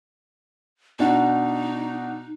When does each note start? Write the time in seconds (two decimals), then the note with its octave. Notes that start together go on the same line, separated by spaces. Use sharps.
0.99 B2 D4 D#4 F#4